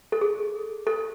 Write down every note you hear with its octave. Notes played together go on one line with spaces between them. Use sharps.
A4
G#4
A4